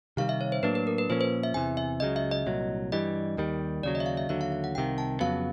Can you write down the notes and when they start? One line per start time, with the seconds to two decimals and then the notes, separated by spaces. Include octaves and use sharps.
0.17 C3 D#3 G3 F5
0.29 E5
0.41 C#5
0.52 C5
0.63 A2 F#3 A#3 D4 B4
0.75 B4
0.87 A#4
0.98 B4
1.09 A#2 F3 A#3 C#4 C5
1.21 C5
1.44 E5
1.54 E2 C3 E3 G#5
1.77 E5
2.00 C#2 C#3 F#3 D#5
2.16 E5
2.31 D#5
2.46 C2 A#2 F#3
2.92 G2 E3 G3 D#5
3.37 D#2 D#3 G3
3.83 D#2 C#3 F#3 D5
3.95 D#5
4.00 E5
4.06 F5
4.17 E5
4.29 D#2 D3 F#3 E5
4.41 F5
4.52 F5
4.64 F#5
4.75 C2 C3 D#3 G5
4.98 A5
5.20 F2 C#3 F#3 B3 F5